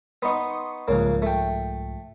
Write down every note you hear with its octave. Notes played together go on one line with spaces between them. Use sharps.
B3 D#4 C6 C#6
C2 G#2 C#3 F3 A#3
A3 G5